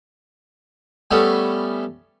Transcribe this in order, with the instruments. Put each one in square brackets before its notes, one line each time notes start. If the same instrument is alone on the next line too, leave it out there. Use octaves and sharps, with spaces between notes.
[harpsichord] G3 A3 B3 C#4 A4